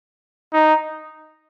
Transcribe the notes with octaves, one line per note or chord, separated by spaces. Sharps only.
D#4